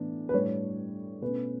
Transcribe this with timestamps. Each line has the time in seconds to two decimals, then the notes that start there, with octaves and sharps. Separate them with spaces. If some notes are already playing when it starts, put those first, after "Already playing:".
Already playing: A2 E3 B3 D4
0.29 B4
0.34 A2 G3 D4 C#5
1.22 B2 A3 C#4 B4